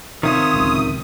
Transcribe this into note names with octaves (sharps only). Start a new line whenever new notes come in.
C3 D#3 F4 C#5 E5 D#6
D1 C#2